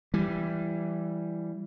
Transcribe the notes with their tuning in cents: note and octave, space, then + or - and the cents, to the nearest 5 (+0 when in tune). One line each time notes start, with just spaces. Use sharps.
E3 +15 G3 +0